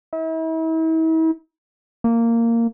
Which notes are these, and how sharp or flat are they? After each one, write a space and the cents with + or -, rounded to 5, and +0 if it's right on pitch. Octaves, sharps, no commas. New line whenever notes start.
E4 -40
A#3 -15